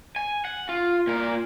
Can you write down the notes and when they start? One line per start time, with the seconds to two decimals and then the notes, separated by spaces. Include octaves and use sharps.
0.16 G#5
0.45 F#5
0.69 F4
1.07 A#2 A#4